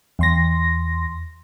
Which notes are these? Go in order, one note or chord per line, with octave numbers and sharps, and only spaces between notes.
E2 C6 A#6